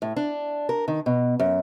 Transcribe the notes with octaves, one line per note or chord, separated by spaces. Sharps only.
A2
D4
A#4
D#3
B2
F#2